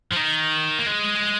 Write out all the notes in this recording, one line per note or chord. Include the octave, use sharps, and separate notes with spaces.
F3
D#3
A#3
G#3